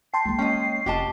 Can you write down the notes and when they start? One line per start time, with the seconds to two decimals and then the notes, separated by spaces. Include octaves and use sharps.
0.14 G5 A5 C6 C7
0.25 G#3 A#3
0.39 C#4 D#5 G5
0.86 F1 G4 D#5 A5